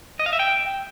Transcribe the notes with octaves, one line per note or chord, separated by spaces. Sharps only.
D#5
F5
E5
G5